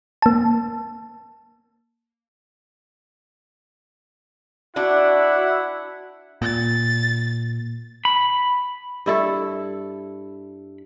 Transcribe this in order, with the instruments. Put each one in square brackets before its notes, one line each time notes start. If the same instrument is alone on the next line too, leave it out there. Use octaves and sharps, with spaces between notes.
[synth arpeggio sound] A#3 A5
[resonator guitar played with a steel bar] D4 [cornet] E4 [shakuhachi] F#4 [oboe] F#5
[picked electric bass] A#2 [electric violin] A6
[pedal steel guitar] B5
[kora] G2 E4 A4